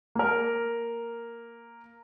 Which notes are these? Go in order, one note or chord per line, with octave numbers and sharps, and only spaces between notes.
A#3 A#4